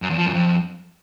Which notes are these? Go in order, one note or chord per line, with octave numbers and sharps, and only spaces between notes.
F#2
E2
F3
F#2
F2